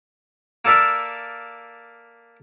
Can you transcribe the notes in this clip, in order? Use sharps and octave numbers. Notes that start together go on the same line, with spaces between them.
A#3 A4 D5 E5 F5